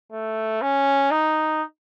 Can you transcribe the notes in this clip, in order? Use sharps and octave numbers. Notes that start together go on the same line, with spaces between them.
A3
C#4
D#4